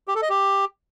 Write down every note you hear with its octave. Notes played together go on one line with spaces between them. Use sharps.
G4
A4
D#5
G4